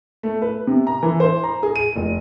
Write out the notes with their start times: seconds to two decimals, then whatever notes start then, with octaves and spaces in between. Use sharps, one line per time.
0.23 A3
0.42 B4
0.67 C3
0.87 A#5
1.03 E3
1.20 C5
1.44 A#5
1.63 G#4
1.76 D#7
1.96 F1